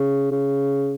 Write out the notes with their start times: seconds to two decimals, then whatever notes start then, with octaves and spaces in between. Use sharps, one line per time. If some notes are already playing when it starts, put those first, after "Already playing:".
Already playing: C#3
0.31 C#3